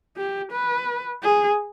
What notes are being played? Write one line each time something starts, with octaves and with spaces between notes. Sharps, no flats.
G4
B4
G#4